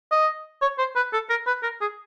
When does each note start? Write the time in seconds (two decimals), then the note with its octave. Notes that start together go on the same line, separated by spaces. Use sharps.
0.12 D#5
0.62 C#5
0.78 C5
0.96 B4
1.13 A4
1.30 A#4
1.47 B4
1.63 A#4
1.81 G#4